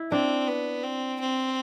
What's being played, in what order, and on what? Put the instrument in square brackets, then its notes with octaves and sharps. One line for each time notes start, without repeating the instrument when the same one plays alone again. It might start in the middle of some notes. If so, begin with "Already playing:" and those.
Already playing: [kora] E4
[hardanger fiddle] C4 [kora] D4
[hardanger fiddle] B3
C4
C4